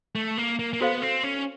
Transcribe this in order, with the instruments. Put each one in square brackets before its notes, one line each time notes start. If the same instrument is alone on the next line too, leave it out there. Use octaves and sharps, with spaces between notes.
[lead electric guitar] A3
A#3
A#3
A#3
[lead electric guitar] B3 [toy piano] F#4 A4 C5 F5
[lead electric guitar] C4
C#4